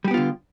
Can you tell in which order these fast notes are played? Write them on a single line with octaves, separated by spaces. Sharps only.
G3 G4 B3 F4 D3